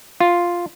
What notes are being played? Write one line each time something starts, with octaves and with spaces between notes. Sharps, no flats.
F4